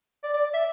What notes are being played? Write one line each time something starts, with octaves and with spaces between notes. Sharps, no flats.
D5
D5
E5